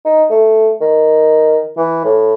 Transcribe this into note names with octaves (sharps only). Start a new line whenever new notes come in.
D#4
A3
D#3
E3
A2